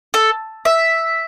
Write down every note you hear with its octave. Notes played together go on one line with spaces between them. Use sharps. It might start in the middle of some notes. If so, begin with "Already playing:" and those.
A4
E5